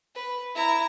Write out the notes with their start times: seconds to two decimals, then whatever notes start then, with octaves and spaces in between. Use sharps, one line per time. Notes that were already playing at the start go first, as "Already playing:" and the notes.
0.15 B4
0.55 E4 A#5